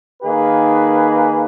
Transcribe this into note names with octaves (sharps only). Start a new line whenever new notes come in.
D#3 A#3 D#4 G#4 B4